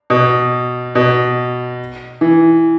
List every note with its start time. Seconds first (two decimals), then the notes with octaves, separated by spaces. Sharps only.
0.10 B2
0.95 B2
2.21 E3